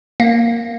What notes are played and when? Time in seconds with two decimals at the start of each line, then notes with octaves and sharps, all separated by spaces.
0.20 A#3